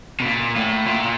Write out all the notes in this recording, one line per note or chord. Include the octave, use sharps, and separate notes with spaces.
B2
A#2
A2
A#2